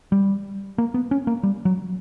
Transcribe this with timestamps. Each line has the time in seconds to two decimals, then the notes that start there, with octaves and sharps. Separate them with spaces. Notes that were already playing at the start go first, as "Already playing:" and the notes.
0.12 G3
0.78 A#3
0.94 B3
1.11 C#4
1.27 A#3
1.43 G3
1.65 F#3